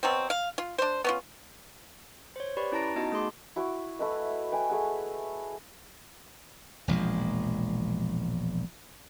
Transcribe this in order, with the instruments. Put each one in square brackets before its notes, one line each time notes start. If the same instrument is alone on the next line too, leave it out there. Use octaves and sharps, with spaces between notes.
[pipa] B2 F#3 C4
F5
F4
D4 C5
B3 C#4 F4
[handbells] C5 C#5
G4 B4 D5 B5 C#6
C#4 E4 A5 A#5 A#6 D7
B3 D#4 F#4 D#5 A5
A3 G#4 C6 D6
[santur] E4 F#4 C#6 D6
A3 E4 B4 D#5
B4 G5 G#5
A3 G#4 F#5
[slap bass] E1 A#1 F3 G#3